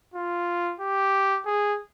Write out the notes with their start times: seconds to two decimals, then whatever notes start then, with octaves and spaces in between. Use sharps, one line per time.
0.14 F4
0.80 G4
1.46 G#4